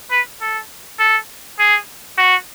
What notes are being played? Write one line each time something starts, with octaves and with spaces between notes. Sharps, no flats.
B4
A4
A4
G#4
F#4